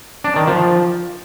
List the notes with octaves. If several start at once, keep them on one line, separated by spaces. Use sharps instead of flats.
D4
D#3
F3